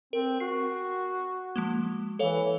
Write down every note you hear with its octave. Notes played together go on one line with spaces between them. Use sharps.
C4 A#4
F#4 C7
F3 G#3 A#3
E3 A4 C#5 F5